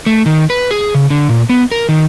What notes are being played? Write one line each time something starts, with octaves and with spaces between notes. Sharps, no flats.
A3
D#3
B4
G#4
C#3
D3
A#2
B3
A#4
D#3